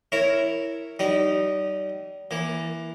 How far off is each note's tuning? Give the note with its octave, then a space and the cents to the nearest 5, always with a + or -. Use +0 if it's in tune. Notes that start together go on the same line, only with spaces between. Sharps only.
E4 +0 A#4 -10 C#5 +0
G3 -35 D#4 -10
E3 +0 A#3 +20